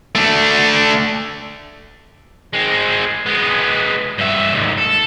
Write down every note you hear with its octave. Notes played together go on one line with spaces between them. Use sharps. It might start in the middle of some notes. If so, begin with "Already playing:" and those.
A3 D4
G#3 C4
G#3 B3
G2 E5
D#2 G#2
A4